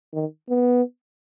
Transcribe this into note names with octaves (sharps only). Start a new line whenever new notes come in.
D#3
B3